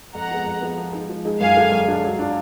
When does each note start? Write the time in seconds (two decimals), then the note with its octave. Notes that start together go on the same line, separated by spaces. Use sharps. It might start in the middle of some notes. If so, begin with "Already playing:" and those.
0.15 F2 F#5 A#5
0.31 F3 G#3 B3
0.46 F2
0.61 F3 G#3 B3
0.78 F3
0.93 G#3 D#4 G#4
1.09 F3
1.25 G#3 D#4 G#4
1.40 F#2 F5 G#5
1.56 D3 G#3 D4 F4
1.71 F#2
1.88 D3 G#3 D4 F4
2.04 F#3
2.19 D4 F4